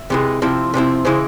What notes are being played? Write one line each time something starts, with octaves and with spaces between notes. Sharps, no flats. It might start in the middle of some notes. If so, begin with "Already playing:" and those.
Already playing: E5
C3 E3 G#3
C3 F3 C4 E4
C3 F3 C4 E4
C#3 E3 G#3 E4 C5